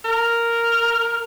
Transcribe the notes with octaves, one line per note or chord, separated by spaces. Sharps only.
A#4